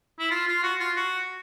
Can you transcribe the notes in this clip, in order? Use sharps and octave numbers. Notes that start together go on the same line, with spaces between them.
E4
F4
F4
F#4
F4
F#4